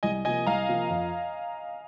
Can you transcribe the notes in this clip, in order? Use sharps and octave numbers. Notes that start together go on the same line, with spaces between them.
C2 D#5 G#5
C3 F3 A#3 D#5 G#5
C2 F5 A#5
C3 F3 A#3
F2